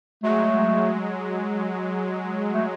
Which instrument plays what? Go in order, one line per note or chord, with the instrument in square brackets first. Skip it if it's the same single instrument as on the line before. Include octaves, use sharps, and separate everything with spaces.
[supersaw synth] F#3 G#3 [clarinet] A3
[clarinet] A3